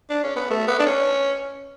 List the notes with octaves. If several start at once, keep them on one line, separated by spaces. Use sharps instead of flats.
D4
C#4
B3
A3
B3
D4
C#4